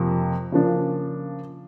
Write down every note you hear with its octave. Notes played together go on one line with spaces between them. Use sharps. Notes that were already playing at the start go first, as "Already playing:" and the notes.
Already playing: F2 C3 F3 A#3
C#3 F3 A#3 D4